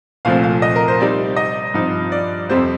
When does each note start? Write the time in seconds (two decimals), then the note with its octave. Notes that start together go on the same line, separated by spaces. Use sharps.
0.25 C2 A#2 F3 A3 C4 F5
0.43 F5
0.62 D#5
0.76 A#4
0.88 C5
1.00 C3 G3 C4 D#4 D5
1.36 D#5
1.74 G2 F3 C4 D#4
2.12 D5
2.49 F2 C3 G3 C4 C5